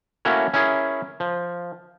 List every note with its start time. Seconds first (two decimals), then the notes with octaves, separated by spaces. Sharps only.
0.25 A3 A#3 C#4 E4 F#4 C#5
0.54 C#4 E4 G#4 A#4
1.20 F3